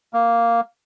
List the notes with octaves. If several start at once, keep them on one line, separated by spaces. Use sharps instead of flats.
A#3